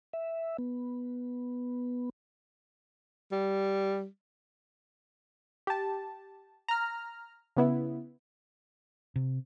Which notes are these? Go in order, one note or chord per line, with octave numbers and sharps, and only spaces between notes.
E5
B3
G3
G4 A5
A#5 F6
C#3 B3 E4
C3